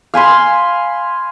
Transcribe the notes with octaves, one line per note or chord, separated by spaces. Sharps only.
F5 G#5 B5 C6